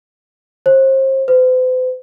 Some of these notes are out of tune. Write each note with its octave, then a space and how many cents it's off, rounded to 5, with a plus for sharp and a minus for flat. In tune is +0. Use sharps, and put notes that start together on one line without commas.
C5 +35
C5 -45